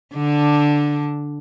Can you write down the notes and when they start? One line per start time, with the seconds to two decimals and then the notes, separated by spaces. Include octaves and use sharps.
0.14 D3 D4